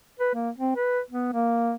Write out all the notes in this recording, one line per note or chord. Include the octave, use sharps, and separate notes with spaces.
B4
A#3
C4
B4
B3
A#3